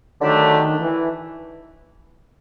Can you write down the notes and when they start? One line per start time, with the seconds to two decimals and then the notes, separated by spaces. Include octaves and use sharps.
0.21 D3 D#3 F#3 A3 D4 G4
0.78 E3